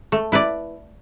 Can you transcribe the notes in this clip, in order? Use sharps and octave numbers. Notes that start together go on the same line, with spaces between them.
A3
E4 B4 D5